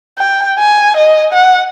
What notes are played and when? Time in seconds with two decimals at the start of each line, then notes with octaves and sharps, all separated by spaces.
0.18 G5
0.59 G#5
0.97 D#5
1.33 F#5